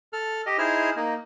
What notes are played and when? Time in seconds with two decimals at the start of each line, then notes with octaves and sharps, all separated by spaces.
0.13 A4 F6
0.46 G4 D#5
0.58 D#4 E4 G#4 C5 F6
0.96 A#3 D#4